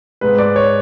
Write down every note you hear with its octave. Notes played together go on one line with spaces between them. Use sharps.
G#2 G#3 B4
D5
C#5